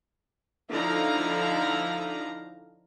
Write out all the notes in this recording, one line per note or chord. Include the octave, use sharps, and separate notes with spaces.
D3 F3 D#4 E4 F5 A#5